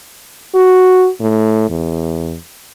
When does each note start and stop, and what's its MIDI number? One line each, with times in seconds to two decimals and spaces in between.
0.55 1.09 66
1.21 1.65 45
1.70 2.37 40